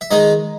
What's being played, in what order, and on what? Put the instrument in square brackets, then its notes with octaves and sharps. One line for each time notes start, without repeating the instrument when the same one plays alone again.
[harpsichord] E5
D#3 G#3 D#4 D#5